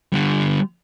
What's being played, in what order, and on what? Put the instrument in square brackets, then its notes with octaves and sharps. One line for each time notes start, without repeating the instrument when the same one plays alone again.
[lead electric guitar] D3 G3